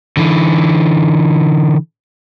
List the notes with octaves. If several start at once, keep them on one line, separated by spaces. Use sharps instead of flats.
D3 E3